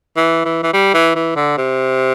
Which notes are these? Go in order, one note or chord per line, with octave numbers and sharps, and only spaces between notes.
E3
E3
E3
G3
E3
E3
D3
C3